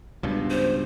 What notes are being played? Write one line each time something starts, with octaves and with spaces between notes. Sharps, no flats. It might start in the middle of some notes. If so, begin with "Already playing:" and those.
C#2 G2 B2
C5